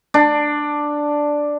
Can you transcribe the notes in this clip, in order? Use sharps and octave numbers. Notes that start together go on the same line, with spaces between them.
D4